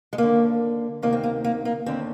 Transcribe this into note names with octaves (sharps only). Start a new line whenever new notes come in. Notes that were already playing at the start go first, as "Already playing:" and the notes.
G#3
D#2 D3 A#3
D2 C3 D#3 A#3
C4
A#3
A#3
A#3
D#2 D3 C4